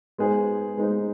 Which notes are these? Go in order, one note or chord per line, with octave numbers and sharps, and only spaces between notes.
G#3 B3 D#4 G#4 C5
G#3 B3 D#4 G#4 C5